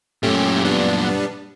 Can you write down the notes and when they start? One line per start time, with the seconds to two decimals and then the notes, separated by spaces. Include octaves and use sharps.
0.23 F#2 A#2 A3 C#4 G4
0.65 G3 B3 D4